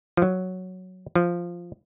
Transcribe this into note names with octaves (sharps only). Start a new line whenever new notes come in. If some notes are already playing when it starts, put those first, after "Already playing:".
F3
F#3
F3